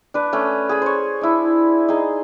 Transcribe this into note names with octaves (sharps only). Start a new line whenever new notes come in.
D4 B4
A3 C#4
G#4 B5
C5 C#5
D4 E4
D#4 G#4